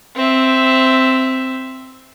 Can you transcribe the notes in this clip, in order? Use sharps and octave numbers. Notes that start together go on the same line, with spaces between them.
C4 E5